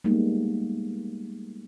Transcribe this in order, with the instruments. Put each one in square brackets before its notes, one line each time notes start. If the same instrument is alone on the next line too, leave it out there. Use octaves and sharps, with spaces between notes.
[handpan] G3 G#3 A#3 B3 D#4